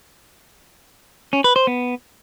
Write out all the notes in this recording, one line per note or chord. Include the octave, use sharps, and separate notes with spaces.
C#4
B4
C5
B3